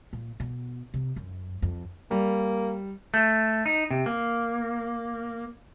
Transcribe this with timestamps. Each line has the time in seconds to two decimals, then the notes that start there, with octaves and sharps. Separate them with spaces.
0.13 A#2
0.40 B2
0.94 C3
1.16 F#2
1.62 F2
2.11 G3 A#3
3.14 A3
3.66 D#4
3.91 C3
4.06 A#3